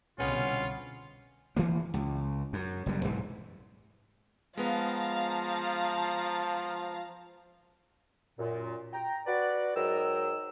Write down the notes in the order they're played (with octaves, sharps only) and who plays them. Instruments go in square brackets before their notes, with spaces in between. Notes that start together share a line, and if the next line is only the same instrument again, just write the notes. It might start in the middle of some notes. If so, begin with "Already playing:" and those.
[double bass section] C2 B2 D3 [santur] G#3 B3 [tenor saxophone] C#4 [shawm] F4
[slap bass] E3 F3 A#3
C#2
F#2
F#1 F#2 G3
B1 G#2 E3
[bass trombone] F3 [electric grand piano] G#3 B3 [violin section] F5 A5 A#5
[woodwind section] F#2 A#2
G5 A#5
F#4 B4 D5
G#2 F#3 A#4 D#5 G5 E6